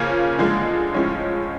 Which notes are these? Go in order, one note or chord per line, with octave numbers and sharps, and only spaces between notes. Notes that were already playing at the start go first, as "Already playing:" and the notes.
Already playing: C#3 F3 A#3 C#4
D3 F3 G#3
A2 F3 G#3 C#4